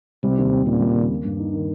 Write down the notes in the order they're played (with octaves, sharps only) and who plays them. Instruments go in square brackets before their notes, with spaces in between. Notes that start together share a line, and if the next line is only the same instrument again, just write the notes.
[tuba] C3 [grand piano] G3
[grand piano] D#2
C4
[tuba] A#2 [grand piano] C#3
[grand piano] G3
D#2
A#3
G2
D#4
D#3